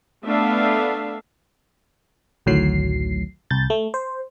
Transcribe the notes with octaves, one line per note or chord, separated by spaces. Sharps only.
A3 B3 D4 E5 F5
A1 D2 A2 D#3 F#3 C7
C2 G6 A6
A3
C5